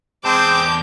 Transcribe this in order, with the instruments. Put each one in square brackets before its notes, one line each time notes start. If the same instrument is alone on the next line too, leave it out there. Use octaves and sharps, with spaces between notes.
[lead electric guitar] E2 A5 [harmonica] G#3 C4 [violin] D6 G6